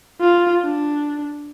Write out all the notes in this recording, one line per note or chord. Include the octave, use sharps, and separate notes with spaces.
F4
D4